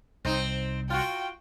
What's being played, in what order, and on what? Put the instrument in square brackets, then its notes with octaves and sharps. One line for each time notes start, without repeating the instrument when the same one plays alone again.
[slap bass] C2 [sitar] C4 D#4
[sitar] F4 F#4 [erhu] G5